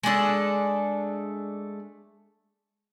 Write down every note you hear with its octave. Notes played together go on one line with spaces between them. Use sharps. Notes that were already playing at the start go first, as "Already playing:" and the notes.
G#3 A3 D4 A4